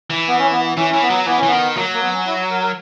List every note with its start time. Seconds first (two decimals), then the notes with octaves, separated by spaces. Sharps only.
0.10 E3
0.28 B3
0.39 C#4
0.52 B3
0.65 B3
0.77 E3 C#4
0.90 E3 C#4
1.02 B3
1.10 F#3
1.27 E3 B3
1.37 C#4
1.43 E3
1.48 D#3 B3
1.76 F#3 A#3
1.94 A#3
2.01 B3
2.13 C#4
2.26 E4
2.50 A#4
2.63 A#4